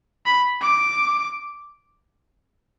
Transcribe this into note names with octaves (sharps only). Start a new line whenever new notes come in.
B5
D6